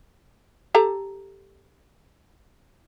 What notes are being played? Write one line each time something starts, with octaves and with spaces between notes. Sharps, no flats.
G4 A4 A#5